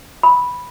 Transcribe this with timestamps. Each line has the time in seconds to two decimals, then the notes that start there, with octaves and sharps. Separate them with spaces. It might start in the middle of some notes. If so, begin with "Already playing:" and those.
0.23 B5